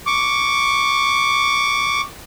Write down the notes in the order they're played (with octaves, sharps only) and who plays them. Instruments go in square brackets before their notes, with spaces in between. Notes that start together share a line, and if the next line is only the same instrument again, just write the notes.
[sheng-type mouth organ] C#6 D6